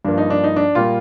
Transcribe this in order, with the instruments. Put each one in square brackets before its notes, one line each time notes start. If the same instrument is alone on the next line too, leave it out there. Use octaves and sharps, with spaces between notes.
[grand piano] G2 F3 A#3 D4
D#4
D4
D#4
D4
A#2 G3 A#3 F4